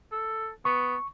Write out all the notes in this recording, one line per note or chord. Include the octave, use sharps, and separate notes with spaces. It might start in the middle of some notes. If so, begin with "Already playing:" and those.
A4
B3 C#6